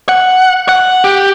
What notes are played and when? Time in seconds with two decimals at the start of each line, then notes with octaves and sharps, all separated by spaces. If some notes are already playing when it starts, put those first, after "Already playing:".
0.09 F#5
0.69 F#5
1.04 G4